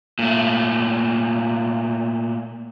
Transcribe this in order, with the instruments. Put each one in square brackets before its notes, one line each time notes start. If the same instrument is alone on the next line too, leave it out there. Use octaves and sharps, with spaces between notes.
[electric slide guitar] A#2 A3